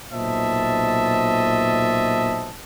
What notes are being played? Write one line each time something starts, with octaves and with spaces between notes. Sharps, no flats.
B1 A#2 C5 D#5 E5 A5